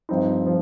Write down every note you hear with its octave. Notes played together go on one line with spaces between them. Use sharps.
G2 F3 C4 D#4
F3